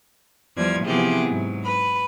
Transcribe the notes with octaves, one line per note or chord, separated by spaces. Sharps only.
E2 F3 G3 D5 G#6
C3 E3 F3 B3 G4 G#4
G#2 F#3
B4 B5